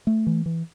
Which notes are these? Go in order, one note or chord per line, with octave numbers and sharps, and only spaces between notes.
A3
E3
E3